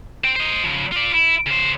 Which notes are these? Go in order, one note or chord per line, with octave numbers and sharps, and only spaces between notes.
C5 G5
C5 D#5
C#3 F3
F4 D5
E4
C#3 C5